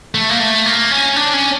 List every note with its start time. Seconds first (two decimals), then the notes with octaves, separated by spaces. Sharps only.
0.15 A3
0.30 A#3
0.40 A3
0.66 A#3
0.91 C#4
1.16 D4
1.33 C#4